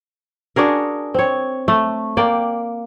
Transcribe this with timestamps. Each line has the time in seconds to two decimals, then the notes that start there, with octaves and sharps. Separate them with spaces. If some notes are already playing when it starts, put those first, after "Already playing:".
0.56 D4 F#4 G#4 A#4
1.14 C4 C#5
1.68 A3
2.17 A#3 D5 G5